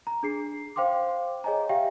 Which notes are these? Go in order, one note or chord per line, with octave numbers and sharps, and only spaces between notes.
A#5
D4 G#4 C7
C5 F5 G5 C6 D6
G#4 C#5 D#5 G#5 A#5
G4 E5 F5 G5